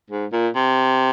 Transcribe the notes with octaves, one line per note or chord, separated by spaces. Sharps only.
G#2
A#2
C3